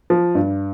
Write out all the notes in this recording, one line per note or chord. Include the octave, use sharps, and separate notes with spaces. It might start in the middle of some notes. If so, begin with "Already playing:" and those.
F3
G2